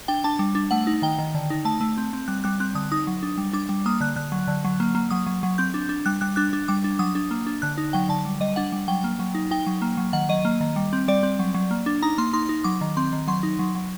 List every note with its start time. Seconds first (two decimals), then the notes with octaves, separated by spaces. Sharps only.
0.08 D4 G5
0.24 D4 A5
0.39 G3
0.55 D4
0.71 A3 F#5
0.87 D#4
1.02 D#3 G5
1.19 D#3
1.34 D3
1.50 D#4
1.65 A3 A5
1.81 A3
1.97 C4
2.13 C4
2.28 G3 F#6
2.44 G3 F#6
2.60 C4 F#6
2.75 D3 D#6
2.92 D#4 D#6
3.07 F#3
3.23 D4
3.38 G3
3.53 D4 D6
3.69 G3
3.86 A#3 D#6
4.00 D3 F#6
4.16 D3 F#6
4.32 F#3
4.48 D3
4.64 F#3
4.80 A#3
4.95 A#3
5.11 F#3 D#6
5.27 F#3
5.43 F#3
5.58 C4 G6
5.74 D4
5.89 D4
6.06 G3 F#6
6.21 G3 F#6
6.36 D4 F#6
6.53 D4
6.68 G3 D6
6.84 D4
6.99 F#3 D#6
7.15 D4
7.31 A#3
7.47 D4
7.62 D3 F#6
7.78 D#4
7.93 F#3 G5
8.09 D3 A5
8.25 G3
8.41 G3 D#5
8.56 D4 F#5
8.72 G3
8.88 F#3 G5
9.04 A#3
9.19 F#3
9.35 D#4
9.51 D#4 G5
9.67 F#3
9.82 A#3
9.97 F#3
10.13 D#3 F#5
10.29 F#3 D#5
10.45 A#3
10.61 D#3
10.76 G3
10.93 C4
11.08 G3 D5
11.23 C4
11.39 F#3
11.54 F#3
11.71 A#3
11.86 D4
12.02 D#4 A#5
12.18 A#3 C6
12.33 D#4 C6
12.49 D#4
12.64 F#3 D6
12.81 D#3
12.97 C4 C6
13.13 D#3
13.28 F#3 C6
13.43 D#4
13.59 F#3
13.75 F#3